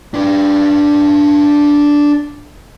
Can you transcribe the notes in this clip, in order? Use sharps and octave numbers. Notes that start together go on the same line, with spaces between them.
D4 B4